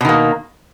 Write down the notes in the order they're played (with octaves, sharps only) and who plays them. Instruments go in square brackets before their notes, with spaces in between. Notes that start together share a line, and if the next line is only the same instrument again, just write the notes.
[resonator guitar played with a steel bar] B2
D#3
A#3